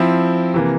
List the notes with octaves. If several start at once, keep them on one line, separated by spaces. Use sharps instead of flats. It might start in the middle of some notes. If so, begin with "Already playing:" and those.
Already playing: F3 C4 E4
C3 E3 A#3